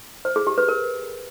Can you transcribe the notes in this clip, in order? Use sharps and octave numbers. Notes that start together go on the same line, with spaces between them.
C5
G#4
G4
B4
A#4